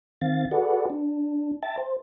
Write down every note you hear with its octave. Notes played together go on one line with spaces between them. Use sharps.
D#3 C4 F5 A6
F#4 G#4 A4 B4 D5 F#5
D4
E5 G5 A5 A6
C5